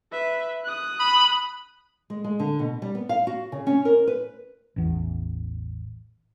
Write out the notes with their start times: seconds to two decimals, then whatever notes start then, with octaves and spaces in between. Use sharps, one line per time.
0.12 B4 E5
0.65 D#6 F#6
0.99 B5
2.10 G#3
2.24 G#3
2.40 D3
2.59 B2
2.82 G3
2.95 B3
3.09 F5
3.27 F#4
3.52 C#3
3.67 C#4
3.85 A#4
4.07 B4
4.76 A1 E2